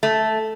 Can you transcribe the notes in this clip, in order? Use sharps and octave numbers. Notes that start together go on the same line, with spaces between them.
A3